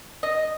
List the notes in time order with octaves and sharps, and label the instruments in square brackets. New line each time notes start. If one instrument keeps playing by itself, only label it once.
[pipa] D#5